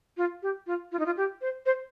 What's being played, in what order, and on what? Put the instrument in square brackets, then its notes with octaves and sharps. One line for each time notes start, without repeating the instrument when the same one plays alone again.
[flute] F4
G4
F4
F4
D#4
F4
G4
C5
C5